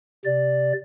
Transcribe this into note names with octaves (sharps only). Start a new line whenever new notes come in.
C3 D5